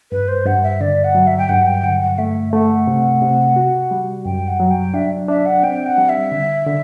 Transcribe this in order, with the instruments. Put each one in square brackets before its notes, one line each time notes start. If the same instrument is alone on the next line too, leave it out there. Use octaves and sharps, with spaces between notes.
[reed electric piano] G2 [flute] B4
[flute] C5
[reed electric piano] G2 [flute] F#5
[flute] E5
[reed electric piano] D3 [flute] D5
[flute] F#5
[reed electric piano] F#3
[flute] E5
G5
[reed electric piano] G2 [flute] F#5
[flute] G5
[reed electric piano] D3 [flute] F#5
[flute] F#5
[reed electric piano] A3 [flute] E5
[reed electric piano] A3 [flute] F#5
[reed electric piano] C3
C3
F#4
G3
[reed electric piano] F#2 [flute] G5
[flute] F#5
[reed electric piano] F#3
[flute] G5
[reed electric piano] D4 [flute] E5
[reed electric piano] D4 [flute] E5
[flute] F#5
[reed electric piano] C4 [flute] G5
[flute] F#5
[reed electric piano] G3
[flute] E5
[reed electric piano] D3
D3